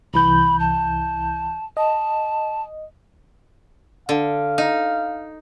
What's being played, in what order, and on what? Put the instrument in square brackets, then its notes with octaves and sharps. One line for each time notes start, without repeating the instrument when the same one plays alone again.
[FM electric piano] C2 E3 G6 [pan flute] B5
[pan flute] A5
[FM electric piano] D#5 [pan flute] A5
[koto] D3 [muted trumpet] F5
[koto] D#4